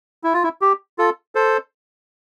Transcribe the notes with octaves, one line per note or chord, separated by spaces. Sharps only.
E4
F4
E4
G4
F4 A4
A4 C5